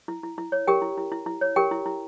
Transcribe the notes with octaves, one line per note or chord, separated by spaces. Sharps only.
E4
E4
E4
C#5
G4 A#4 G5
E4
E4
E4
E4
C#5
G4 A#4 G5
E4
E4